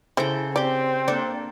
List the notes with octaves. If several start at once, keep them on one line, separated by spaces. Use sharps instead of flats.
C#3 E4 A4 C5 G5
C4 G4 D5 G5
A#3 D4 A4 D5